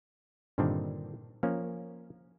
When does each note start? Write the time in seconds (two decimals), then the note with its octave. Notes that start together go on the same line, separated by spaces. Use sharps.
0.58 G2 A#2 D3 D#3 C4 D4
1.43 F3 A#3 C#4